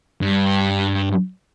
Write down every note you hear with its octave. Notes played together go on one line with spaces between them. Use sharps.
G2